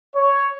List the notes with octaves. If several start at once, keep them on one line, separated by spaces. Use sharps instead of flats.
C#5